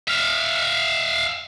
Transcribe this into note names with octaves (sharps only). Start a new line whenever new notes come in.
E5 F5